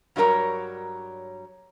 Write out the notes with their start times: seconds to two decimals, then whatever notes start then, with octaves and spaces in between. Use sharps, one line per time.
0.16 G2 F#3 G3 D#4 A#4 C#5